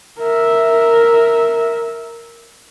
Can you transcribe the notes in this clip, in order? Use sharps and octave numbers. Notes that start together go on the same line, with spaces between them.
A#4 E5